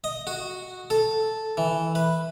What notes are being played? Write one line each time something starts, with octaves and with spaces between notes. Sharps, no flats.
D#5
F#4
A4
E3
B4